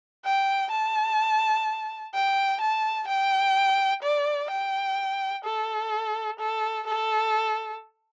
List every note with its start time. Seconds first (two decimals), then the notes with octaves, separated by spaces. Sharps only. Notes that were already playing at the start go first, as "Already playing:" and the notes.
0.25 G5
0.72 A5
2.14 G5
2.61 A5
3.08 G5
4.03 D5
4.51 G5
5.45 A4
6.40 A4
6.87 A4